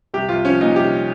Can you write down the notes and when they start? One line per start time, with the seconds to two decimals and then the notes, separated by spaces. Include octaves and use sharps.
0.14 C2 G4
0.29 C2 F4
0.45 F3 C#4
0.60 A#2 D#4
0.76 C2 G4